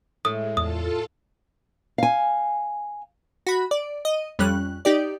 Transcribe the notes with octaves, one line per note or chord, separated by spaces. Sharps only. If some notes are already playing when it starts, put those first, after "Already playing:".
A2 G#3 D#6
E2 F4 A4 A5 D#6
F5 G#5
F#4 B5
D5
D#5
F2 G3 C#4 F#6
D#4 G4 D5